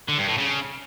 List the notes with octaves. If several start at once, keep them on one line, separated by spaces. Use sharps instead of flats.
D3
G2
A2
C#3